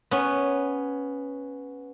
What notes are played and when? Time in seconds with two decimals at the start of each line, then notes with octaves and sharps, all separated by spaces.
0.11 B3 C#4